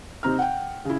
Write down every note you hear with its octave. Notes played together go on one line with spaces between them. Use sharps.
C3 C4 D#4 A#5 F6
F#5 G5
C#3 E4